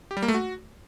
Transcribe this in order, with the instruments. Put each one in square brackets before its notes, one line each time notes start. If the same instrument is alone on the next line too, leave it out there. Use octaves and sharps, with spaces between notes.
[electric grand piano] G4
G3
A#3
A3
F#4